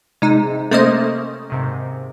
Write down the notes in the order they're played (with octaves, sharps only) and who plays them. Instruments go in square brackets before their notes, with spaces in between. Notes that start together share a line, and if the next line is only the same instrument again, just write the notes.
[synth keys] C3 [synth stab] G#3 D#4
[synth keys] C3 A#3 C#4 [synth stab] A3 C5 D#5
[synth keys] G#2 C3 D#3